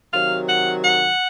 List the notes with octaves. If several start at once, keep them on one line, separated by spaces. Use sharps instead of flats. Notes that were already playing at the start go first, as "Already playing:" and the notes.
C3 D#3 F#3 F5
F#5
F#5